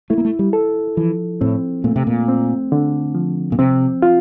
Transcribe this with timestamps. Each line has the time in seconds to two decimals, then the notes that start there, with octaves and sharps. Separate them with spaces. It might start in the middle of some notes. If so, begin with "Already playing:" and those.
0.10 A3 E4
0.18 A#3
0.25 A3
0.39 G3
0.53 A4
0.97 E3 F3
1.41 A2 C4
1.84 A#2 A3
1.96 C3
2.07 A#2
2.28 C4
2.72 D3
3.15 F3
3.52 A#2
3.59 C3 C4
4.02 F4